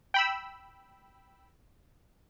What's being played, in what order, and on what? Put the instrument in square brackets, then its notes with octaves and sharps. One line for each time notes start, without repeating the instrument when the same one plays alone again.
[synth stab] G5 B5 E6